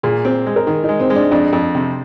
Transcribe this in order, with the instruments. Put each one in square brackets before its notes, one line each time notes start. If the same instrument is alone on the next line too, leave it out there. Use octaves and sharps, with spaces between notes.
[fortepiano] A#2 [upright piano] G#4
[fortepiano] C4
G#3
[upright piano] A#4
[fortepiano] D#3 [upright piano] G#4
[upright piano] D#4
[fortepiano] G#3
[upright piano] C4
[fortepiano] G#3
[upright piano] D4
[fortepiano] F2 [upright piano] D4
[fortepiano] F2
C3